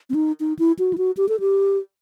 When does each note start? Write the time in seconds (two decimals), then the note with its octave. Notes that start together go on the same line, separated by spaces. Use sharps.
0.10 C4
0.14 D#4
0.40 D#4
0.59 E4
0.79 F#4
0.93 E4
0.98 F#4
1.17 G4
1.29 A4
1.40 G4